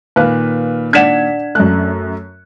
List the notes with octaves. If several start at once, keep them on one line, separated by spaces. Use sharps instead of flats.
A#2 D#3 B4 F5 F#6
D4 D5 F#5 G#6 B6 E7
F#2 A3 F#6